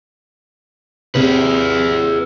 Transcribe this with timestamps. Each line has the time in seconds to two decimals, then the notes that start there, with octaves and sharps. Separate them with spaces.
1.15 C3 C4 G#4 B4